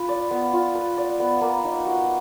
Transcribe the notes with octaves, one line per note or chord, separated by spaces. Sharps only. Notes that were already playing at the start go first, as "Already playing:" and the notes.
Already playing: F4 B4
D5
B3
F4
B4
D5
B3
A#3
D#4
F#4